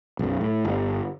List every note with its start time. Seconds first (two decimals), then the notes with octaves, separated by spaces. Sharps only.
0.19 B1 F#2
0.41 A2
0.65 G1